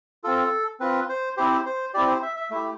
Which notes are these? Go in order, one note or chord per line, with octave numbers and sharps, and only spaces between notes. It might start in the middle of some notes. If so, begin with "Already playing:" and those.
C4 F4 A4
C4 F4 B4
C5
C4 E4 G4 C5
C5
C4 E4 G4 D5
C5
E5
E5
A3 E4 G4 E5